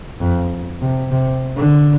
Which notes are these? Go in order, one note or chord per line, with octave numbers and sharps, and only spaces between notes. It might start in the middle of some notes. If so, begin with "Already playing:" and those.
F2
C3
C3
D3